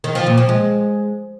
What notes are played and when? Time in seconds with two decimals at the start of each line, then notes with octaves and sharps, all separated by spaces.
0.04 D#3
0.15 F3
0.26 A#2
0.38 F3
0.49 G#3